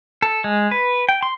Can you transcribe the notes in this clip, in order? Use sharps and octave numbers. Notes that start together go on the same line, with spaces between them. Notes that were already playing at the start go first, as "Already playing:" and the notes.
A4
G#3
B4
G5
C6